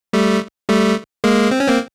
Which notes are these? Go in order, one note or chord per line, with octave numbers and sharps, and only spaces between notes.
G3 A3
G3 A3
G#3 A#3
C4
C#4
A#3 C4